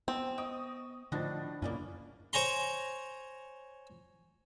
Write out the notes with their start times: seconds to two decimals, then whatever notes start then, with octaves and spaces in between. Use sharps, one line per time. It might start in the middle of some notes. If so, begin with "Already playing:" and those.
0.08 B3 C4
0.38 D#5 G5 C#6 D#6
1.12 A2 D3 F3 D4 D#4 F#4 A6
1.62 F#2 A#2 C#3 A#3 B3 C#4 D4
2.33 C5 C#5 G#5 A#5 C6